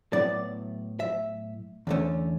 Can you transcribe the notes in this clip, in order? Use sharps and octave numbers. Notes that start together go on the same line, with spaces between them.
A2 F#3 B3 E4 D5
E5
E2 D3 A3 C#4